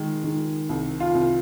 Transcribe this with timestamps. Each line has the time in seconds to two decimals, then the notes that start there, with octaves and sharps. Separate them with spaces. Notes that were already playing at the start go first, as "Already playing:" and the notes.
Already playing: D#3 G#3
0.24 D#3
0.69 C2
1.00 F4
1.15 C2